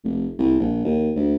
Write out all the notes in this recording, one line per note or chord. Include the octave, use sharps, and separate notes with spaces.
F1
C2
A#1
D#2
D2